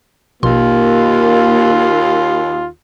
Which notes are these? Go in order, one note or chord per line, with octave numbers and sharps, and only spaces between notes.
A#1 D#2 B2 A#3 F4 C6